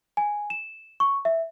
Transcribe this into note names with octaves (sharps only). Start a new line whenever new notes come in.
G#5
E7
C#6
E5